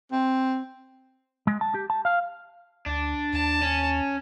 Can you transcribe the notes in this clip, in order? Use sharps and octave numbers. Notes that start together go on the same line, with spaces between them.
C4
G#3
A5
G4
A5
F5
D2 D4
D#2 A5
C#4